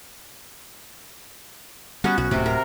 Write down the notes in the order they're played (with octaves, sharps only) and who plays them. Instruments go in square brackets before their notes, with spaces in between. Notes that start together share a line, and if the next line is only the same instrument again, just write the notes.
[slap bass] G3 [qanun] B3 C#4 F#4
[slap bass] B1 [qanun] F#4
[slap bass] D1 A2 [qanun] C3
[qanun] A#4